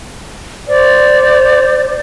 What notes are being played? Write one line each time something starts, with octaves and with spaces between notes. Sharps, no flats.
C5 D5